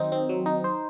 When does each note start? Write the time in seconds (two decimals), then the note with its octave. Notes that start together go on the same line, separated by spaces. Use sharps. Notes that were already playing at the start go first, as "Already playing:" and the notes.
Already playing: D#3 F#3 C4 D#4
0.12 C4
0.29 F#3
0.46 D#4
0.64 C5